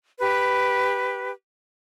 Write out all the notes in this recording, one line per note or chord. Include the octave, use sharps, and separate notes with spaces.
G4 B4